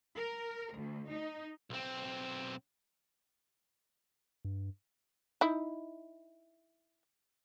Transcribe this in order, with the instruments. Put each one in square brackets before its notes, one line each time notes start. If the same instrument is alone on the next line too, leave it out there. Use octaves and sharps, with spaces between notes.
[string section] A#4
D2
D#4
[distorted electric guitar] B1 C4
[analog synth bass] G2
[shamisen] D#4 E4